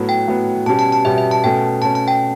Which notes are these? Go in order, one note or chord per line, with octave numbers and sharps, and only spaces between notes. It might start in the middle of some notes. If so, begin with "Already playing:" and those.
Already playing: A2 F#3 B3
G5
A2 F#3 B3
B2 G3 C#4 G4 A5
A5
A5
B2 G3 C#4 G4 E5
E5
A5
B2 A3 C#4 G5
B2 A3 C#4 A5
A5
G5